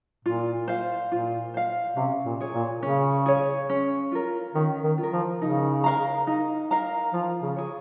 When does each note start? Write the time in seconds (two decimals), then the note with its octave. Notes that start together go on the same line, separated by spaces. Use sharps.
0.25 A#2 F4
0.68 C5 F5
1.11 A#2 F4
1.54 C5 F5
1.97 C3 C#4
2.25 A#2
2.40 G#4 C#5
2.54 A#2
2.83 C#3 C#4
3.26 G#4 C#5
3.69 C#4
4.12 F4 A#4
4.55 D#3 C#4
4.84 D#3
4.98 F4
5.03 A#4
5.13 F3
5.41 C#3 D#4
5.84 A#4 F5 A#5
6.27 D#4
6.71 A#4 F5 A#5
7.13 F3 F4
7.42 C#3
7.56 G#4 C#5